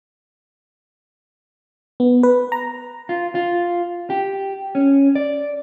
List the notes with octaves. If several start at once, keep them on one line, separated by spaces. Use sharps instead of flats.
B3
B4
A#5
F4
F4
G4
C#4
D5